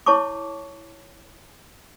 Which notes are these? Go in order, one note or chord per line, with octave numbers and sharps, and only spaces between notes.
E4 C#5 A5 C#6 D6